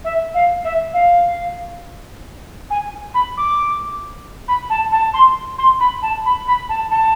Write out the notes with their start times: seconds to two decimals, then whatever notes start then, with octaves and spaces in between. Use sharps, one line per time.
0.04 E5
0.34 F5
0.64 E5
0.93 F5
2.70 G#5
3.14 B5
3.37 D6
4.48 B5
4.69 A5
4.92 A5
5.13 C6
5.58 C6
5.80 B5
6.02 A5
6.25 B5
6.47 B5
6.69 A5
6.91 A5